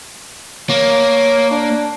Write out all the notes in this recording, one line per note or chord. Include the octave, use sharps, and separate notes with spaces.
A#3 C#5
D4